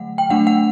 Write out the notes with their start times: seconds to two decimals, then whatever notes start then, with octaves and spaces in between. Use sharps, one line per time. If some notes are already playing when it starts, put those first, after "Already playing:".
Already playing: D3 F#3 A3 F#5
0.18 G5
0.30 F#3 A3 D4 F#5
0.47 F#5